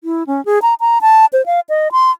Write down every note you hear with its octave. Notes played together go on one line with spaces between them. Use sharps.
E4
C#4
G#4
A#5
A#5
A5
C5
F5
D#5
C6